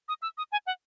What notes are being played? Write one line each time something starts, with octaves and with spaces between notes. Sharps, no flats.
D#6
E6
D#6
G#5
F#5